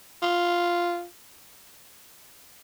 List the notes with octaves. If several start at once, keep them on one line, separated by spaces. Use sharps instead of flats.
F4